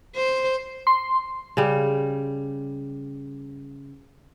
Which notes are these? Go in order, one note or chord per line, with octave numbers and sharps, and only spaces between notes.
C5
C6
C#3 G3